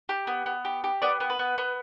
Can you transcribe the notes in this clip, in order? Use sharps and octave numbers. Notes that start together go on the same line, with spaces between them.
G4
B3
B3
G4
G4
B3 D5
B3
B4
B3
B3